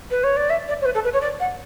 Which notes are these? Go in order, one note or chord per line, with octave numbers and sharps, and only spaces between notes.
B4
C#5
D5
E5
D5
C#5
B4
A4
B4
C#5
D5
F#5